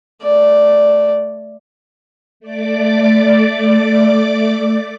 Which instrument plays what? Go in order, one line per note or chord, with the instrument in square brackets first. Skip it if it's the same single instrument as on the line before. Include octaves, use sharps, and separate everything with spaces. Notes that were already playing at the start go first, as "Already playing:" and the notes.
[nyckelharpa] A3 D5
[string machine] A3 D5 D6